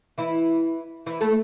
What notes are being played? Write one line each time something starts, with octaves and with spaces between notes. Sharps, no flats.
E3 E4
E3 E4
A3 A4